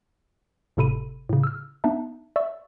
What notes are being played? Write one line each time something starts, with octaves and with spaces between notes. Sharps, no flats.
G1 A2 C3 A4 B5 D#7
A2 C#3
E6 F6
B3 D4 D#4 E5 A5
D5 E5 C#6 E6